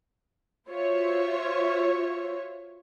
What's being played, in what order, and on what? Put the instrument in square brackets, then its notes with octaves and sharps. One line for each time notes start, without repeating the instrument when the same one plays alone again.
[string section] F4 F#4 C5 C#5 E5